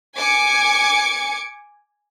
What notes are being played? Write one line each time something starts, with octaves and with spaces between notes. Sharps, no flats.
G#5 D6 C#7